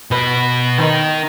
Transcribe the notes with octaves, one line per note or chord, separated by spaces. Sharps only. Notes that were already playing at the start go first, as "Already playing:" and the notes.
B2 B4
D#3 D#4